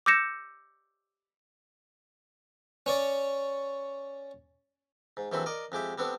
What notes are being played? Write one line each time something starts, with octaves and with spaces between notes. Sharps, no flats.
D6 E6 G6 A#6 C#7 E7
C#4 C#5 D5
G#2
A#1 E3 F#3 C4 A4 B5
A#4 D5 D#5
F2 G#3 G4 E5
G3 B3 C4 D4 A4